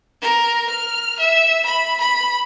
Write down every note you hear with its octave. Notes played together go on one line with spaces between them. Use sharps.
A#4
F6
E5
B5
B5